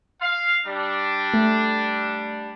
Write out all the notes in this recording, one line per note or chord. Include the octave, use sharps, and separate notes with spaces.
F5
G3 D4
A3